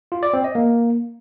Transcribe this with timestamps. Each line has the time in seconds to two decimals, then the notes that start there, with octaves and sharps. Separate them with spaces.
0.12 F4
0.23 D5
0.33 C4
0.44 D#5
0.55 A#3